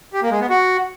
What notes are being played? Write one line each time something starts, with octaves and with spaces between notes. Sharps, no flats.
G4
A#3
G#3
B3
F#4